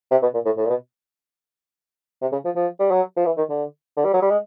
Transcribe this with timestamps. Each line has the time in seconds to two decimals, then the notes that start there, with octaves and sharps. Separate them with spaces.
0.11 C3
0.22 B2
0.34 A#2
0.45 A2
0.57 A2
0.65 A#2
0.69 B2
2.22 C3
2.32 C#3
2.45 F3
2.56 F3
2.80 G3
2.91 F#3
3.17 F3
3.26 E3
3.37 D#3
3.49 D3
3.97 D3
4.05 G3
4.13 F#3
4.22 G3
4.30 G#3